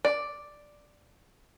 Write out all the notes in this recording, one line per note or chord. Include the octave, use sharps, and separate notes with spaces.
D5